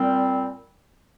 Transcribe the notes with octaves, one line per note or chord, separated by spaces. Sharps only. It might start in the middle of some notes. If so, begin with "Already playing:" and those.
Already playing: A#2 G3 C4